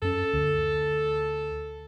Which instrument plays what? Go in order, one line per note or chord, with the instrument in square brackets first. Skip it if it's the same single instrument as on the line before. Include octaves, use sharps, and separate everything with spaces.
[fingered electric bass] F#2 C#4 [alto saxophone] A4
[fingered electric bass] D2